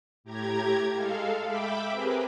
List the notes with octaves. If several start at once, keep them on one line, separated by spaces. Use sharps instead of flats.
A2 G4 A#5 G#6
G#3 A4 F5
E5 G5 B5 D6
C4 G4 G#4 A#4 B4